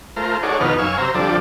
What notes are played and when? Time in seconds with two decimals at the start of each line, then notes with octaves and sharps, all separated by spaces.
0.16 A3 F4 A#4 C5
0.43 D#4 F#4 G#4 A4 C#5 D5
0.60 F2 B2 D#3 D#4 B4 F6
0.78 F#2 F5 G#5 C#6 E6
0.98 C3 C5 A#5 E6
1.15 F2 D3 F3 G3 A4 D5